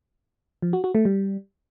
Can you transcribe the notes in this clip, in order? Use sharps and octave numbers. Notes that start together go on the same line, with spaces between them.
F3
F#4
F#4
A3
G3